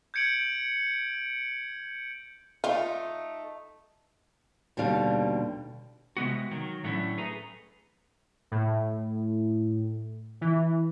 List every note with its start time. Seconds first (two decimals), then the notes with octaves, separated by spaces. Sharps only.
0.14 G6 G#6 C#7 D7 F#7
2.64 A3 D#4 F4
4.77 D#2 B2 D3 G3 F5
6.17 C3 G#3 B3 F#4
6.51 D#3 F#3
6.84 A2 F#3 A3 C#4 D4 E4
7.18 A3 G#4 B4 A#5
8.52 A2
10.41 E3